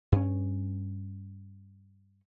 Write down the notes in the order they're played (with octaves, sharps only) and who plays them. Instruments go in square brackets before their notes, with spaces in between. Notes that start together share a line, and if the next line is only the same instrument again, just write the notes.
[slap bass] G2 C#4